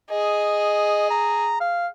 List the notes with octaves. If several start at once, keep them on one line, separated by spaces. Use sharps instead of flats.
G#4 D#5
A#5
F5